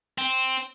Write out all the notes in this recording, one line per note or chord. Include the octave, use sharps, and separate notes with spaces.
C4